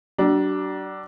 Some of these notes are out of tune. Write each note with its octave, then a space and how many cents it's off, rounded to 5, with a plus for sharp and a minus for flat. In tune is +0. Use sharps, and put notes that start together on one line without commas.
F#3 +45 D4 +0